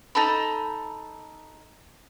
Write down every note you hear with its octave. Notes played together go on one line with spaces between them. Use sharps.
D#4 A4 A5 B5